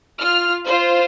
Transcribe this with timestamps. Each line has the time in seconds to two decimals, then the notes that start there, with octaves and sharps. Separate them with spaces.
0.19 F4 F6
0.65 F4 C5